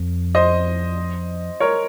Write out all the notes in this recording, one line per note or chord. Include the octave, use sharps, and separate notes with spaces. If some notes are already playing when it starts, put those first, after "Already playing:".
Already playing: F2
C5 D#5
A#4 C#5